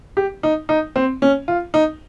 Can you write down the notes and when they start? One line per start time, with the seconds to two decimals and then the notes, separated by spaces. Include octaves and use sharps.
0.17 G4
0.43 D#4
0.69 D#4
0.96 C4
1.22 C#4
1.48 F4
1.74 D#4